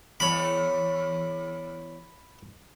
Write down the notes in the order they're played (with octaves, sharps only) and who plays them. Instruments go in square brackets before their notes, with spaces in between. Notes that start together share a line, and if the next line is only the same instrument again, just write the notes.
[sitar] E2 C#5 [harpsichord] B5